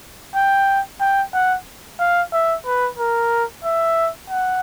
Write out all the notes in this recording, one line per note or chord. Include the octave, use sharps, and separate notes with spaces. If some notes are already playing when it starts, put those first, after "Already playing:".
G5
G5
F#5
F5
E5
B4
A#4
E5
F#5